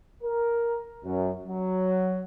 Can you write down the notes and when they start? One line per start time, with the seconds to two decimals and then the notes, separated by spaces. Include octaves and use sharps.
0.23 A#4
1.05 F#2
1.48 F#3